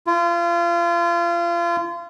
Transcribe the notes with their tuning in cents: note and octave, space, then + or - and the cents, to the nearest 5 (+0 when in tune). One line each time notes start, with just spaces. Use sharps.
F4 -30